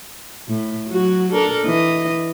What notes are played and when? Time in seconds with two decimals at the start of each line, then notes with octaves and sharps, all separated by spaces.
0.48 A2
0.89 F#3 F#4
1.33 D4 A4 A#4
1.65 E3 D#5